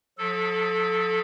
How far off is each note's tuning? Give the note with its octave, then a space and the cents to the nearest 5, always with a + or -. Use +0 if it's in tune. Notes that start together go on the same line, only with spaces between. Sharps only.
F3 +45 A4 -10